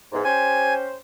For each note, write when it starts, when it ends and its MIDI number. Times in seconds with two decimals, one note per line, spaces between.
0.12 0.20 40
0.12 0.20 44
0.24 0.95 61
0.24 0.95 67
0.24 0.95 72
0.24 0.74 80